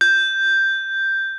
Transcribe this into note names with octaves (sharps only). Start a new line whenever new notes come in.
G6